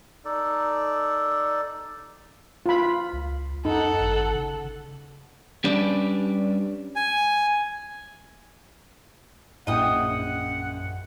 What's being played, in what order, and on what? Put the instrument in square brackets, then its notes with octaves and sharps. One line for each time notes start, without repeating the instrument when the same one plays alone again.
[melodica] D#4 A4 D5
[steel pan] F4 B5
[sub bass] C#2
[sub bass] F#2 [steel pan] D#4 [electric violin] A4 F#5
[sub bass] G#1
C#3
[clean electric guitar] G3 C#4 D4 B4 D5
[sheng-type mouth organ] G#5
[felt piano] A#1 E4 G5 [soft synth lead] F#2 [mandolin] D#5 D#6 [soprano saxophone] F#5